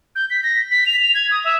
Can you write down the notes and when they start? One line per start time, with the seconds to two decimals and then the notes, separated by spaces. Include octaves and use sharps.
0.15 G6
0.30 B6
0.43 A#6
0.71 B6
0.86 F7
1.02 F7
1.14 G#6
1.31 D#6
1.44 E5